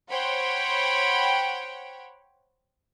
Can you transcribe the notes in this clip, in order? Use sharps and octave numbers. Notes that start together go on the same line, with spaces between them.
C5 C#5 F#5 G5 B5